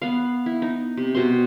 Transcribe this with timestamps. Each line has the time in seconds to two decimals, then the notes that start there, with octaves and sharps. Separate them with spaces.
0.02 B3 F5
0.46 E4
0.62 D#4
0.97 C3
1.15 B2 C5 C6